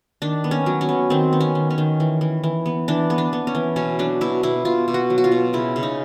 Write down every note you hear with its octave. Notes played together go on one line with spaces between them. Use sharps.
D#3 D4
B3
C#4
F#3
C#4
B3
D#3 C4
B3
C#4
D#3
C#4
D#3
E3
E3
E3
B3
E3 D4
B3
D4
B3
C#4
E3
B2 C#4
F#3 D4
B2 E4
B2 E4
B2 F4
B2
F#4
F#3
F#4
F4
B2
C#3 E4
C#3
D#4